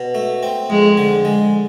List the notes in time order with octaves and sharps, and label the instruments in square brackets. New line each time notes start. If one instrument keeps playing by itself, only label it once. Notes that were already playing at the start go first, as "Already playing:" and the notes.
Already playing: [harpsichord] B2
A3
C4
[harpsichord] F2 [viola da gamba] G#3
[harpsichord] D3
G#3